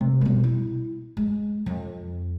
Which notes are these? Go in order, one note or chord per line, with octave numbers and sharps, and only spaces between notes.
C3
B2 G3
E4
G#3
F2